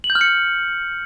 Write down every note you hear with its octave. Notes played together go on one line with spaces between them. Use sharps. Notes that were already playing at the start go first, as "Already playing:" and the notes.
F#7
G6
F6
C#7